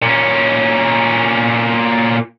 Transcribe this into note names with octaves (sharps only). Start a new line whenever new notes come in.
A#2 C#4